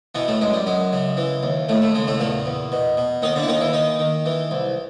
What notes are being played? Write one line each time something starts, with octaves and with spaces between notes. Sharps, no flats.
B2 E3 B3
A2 A3
F#2 G#3
G3
F#2 G#3
C#3
E3
D#2
D#2 A2 A3
A2 A3
C#3 G#3
A2 A3
E2 A#2 A#3
E2
B2
B2
D#2 D#3 D#4
D3 D4
E4
D#2 D#3 D#4
E3 E4
D#3 D#4
D#3
E3
C2